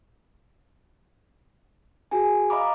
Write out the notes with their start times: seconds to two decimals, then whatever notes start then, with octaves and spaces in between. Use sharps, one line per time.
2.11 F#4 G#4 G#5
2.50 D#5 F5 A#5 B5 D6